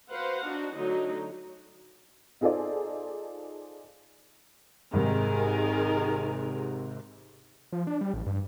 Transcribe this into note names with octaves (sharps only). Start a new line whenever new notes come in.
F#4 B4 C5 F5 F#5
D4 D#4 F#4
D3 F#3 A3 D#4 F#4
D#4 F4 G#4 A4 C5 D5
G#1 C3 D#3 G#4 A#4
F3
D4
G3
A1
G2